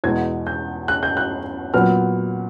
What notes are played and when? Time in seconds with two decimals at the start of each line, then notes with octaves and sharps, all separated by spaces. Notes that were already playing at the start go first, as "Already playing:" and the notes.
0.04 E2 B2 G#3 G#6
0.47 G6
0.88 F#6
1.03 G6
1.17 F#6
1.74 A#2 F#3 B3 F6